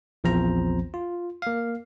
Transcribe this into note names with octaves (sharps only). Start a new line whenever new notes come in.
A#1 E2 F3 C4 C5 A#5
F4
A#3 F5